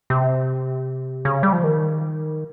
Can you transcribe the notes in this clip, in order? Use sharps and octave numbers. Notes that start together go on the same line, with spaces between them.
C3
C#3
G3
F3
D#3